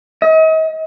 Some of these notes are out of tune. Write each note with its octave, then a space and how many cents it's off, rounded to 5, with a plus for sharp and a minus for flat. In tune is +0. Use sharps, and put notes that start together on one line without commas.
D#5 +40